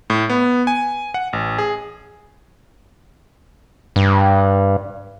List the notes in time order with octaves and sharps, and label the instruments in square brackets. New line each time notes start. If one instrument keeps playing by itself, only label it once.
[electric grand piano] A2
B3
G#5
F#5
A1
G#4
[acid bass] G2